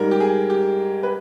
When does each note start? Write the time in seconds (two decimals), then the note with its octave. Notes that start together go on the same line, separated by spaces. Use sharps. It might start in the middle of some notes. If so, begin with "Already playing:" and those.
Already playing: G#2 G3 A#4
0.11 G4
0.20 G#4
0.50 G4
1.03 B4